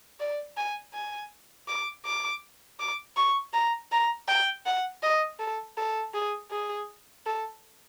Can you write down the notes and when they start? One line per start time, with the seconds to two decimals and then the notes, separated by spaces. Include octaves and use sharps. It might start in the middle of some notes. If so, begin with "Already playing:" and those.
0.20 D5
0.57 G#5
0.93 G#5
1.68 D6
2.05 D6
2.80 D6
3.17 C#6
3.53 A#5
3.92 A#5
4.28 G5
4.66 F#5
5.03 D#5
5.39 A4
5.77 A4
6.14 G#4
6.51 G#4
7.26 A4